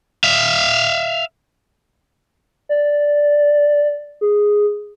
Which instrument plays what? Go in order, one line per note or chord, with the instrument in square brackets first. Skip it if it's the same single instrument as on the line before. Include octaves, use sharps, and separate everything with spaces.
[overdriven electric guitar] E5 F5
[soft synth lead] D5
G#4